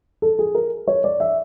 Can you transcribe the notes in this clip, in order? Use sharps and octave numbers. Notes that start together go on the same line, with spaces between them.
A4
G#4
A#4
C#5
D5
E5